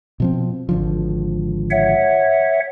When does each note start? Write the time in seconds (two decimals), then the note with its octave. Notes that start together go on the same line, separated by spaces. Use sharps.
0.20 B2 F3 C4
0.69 G#1 D3 F3
1.71 C#5 E5 F#5